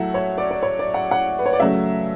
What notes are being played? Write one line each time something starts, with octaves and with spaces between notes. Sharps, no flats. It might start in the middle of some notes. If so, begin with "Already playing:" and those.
Already playing: A2 F#3 A3 E5 F#5
C#5
D5
D5
C#5
D5
F#5
F#5
B4
C#5
D5
C#3 F#3 A3 E5